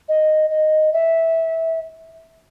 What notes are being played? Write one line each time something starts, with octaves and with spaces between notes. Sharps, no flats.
D#5
D#5
E5